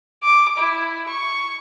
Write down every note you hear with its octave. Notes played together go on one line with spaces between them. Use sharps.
D6
E4
C#6